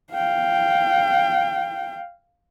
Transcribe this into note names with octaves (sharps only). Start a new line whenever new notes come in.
F5 G5